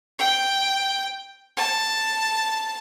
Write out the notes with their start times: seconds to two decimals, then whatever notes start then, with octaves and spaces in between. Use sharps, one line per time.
0.19 G5
1.57 A5